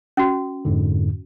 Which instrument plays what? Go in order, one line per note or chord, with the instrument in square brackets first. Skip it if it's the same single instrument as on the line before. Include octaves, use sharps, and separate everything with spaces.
[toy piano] C#4 F#4
[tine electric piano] F2 G#2 D3